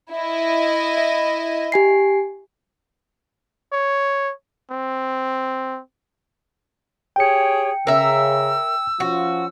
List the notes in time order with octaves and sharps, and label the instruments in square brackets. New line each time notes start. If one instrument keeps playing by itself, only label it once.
[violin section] E4 D#5
[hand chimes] E5
G4 G#5 C7
[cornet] C#5
C4
[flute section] G4 G#4 C#5 [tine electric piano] G5 C#7
[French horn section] C#3 [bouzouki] A#4 E5 [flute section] E6
[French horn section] F3 C#4 F4 [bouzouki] F#4